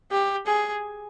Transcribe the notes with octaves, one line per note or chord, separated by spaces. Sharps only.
G4
G#4